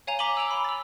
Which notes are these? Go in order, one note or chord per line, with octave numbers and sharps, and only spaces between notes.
C#5 F5 G#5 A#5 F7
A#5 D6 B6 D#7 F#7 G7
E6 D7 F7
B5
E6 A6